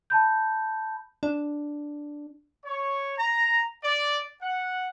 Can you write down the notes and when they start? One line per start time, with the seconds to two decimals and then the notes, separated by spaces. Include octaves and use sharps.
0.10 A5 B5 G6
1.23 D4
2.65 C#5
3.18 A#5
3.83 D5
4.42 F#5